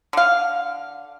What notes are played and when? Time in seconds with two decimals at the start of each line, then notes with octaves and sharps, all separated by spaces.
0.13 D3 F5